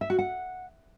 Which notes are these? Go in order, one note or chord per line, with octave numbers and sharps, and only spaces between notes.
E5
F#4
F#5